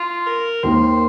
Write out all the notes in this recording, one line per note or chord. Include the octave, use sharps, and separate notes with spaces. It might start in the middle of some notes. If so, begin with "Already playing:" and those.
Already playing: F4
A#4
D#2 D#3 A#3 C5